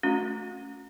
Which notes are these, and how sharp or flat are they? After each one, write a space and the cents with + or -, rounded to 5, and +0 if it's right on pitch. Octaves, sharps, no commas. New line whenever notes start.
A3 -20 C#4 +0 F#4 -30